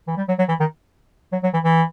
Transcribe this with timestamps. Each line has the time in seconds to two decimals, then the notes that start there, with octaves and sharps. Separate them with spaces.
0.08 E3
0.17 G3
0.28 F#3
0.38 F#3
0.49 E3
0.60 D#3
1.32 F#3
1.43 F#3
1.53 E3
1.64 E3